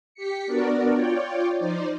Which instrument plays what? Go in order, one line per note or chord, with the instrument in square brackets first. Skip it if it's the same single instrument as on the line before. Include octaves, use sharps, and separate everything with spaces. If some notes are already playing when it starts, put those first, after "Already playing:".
[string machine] G4 B6 C#7
B3 D4 F#4 A#4 D5
F4 C#5 D5 G5
F3 D#4 C5 D5